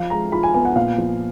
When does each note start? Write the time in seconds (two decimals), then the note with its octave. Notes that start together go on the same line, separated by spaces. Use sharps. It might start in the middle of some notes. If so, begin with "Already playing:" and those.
Already playing: F3 F5
0.10 G#3 A#5
0.32 F4 B5
0.43 G#5
0.54 B3 G#5
0.65 F#5
0.76 A#2 F5
0.98 F3